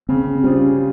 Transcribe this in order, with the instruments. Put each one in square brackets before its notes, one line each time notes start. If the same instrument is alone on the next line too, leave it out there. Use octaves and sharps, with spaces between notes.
[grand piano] C#3 [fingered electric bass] C4
[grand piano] G3 C4 F4 G#4 [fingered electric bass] C#4